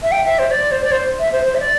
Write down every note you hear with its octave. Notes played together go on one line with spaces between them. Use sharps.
E5
G5
E5
C5
D5
C5
D5
C5
E5
C5
C5
E5
D5